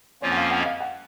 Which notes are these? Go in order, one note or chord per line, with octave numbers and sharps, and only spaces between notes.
F2 F3 A#3 C#4 F4 C#5
F#5
F5
F#5
D#5
F5
F#5